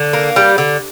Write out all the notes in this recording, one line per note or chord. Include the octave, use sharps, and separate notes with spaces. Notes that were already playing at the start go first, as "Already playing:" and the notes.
Already playing: D3
A#3
G3
D3